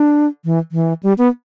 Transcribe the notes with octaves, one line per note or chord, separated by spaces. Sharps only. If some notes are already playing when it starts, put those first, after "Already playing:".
Already playing: D4
E3
E3
G3
B3